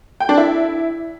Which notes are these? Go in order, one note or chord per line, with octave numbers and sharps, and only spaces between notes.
G5
D4
E4